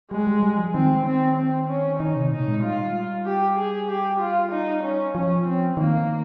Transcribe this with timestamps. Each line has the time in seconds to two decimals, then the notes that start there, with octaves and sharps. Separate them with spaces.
0.11 G3 G#3
0.27 G3
0.43 G3
0.58 F3
0.74 D#3 C4
1.06 C4
1.37 C4
1.69 C#4
2.00 D#3 D#4
2.16 C3
2.31 A#2 D#4
2.48 G#3
2.63 G3 F4
3.26 G4
3.58 G#4
3.88 G4
4.20 F4
4.52 D#4
4.84 C#4
5.15 F3 C#4
5.46 C4
5.77 D#3 A#3